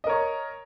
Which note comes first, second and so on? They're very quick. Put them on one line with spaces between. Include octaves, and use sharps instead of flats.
D#5 A#4 C#5